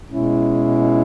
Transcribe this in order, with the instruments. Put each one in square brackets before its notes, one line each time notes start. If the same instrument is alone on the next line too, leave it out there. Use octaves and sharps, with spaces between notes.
[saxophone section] B2 G#3 C#4 E4